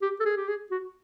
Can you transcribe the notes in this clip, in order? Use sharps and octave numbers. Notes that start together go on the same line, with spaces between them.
G4
A4
G#4
G4
G#4
F#4